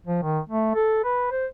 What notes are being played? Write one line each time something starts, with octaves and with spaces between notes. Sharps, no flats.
F3
D#3
A3
A4
B4
C5